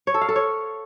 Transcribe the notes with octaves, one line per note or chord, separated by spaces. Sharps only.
C#5
A4
F5
A4
C#5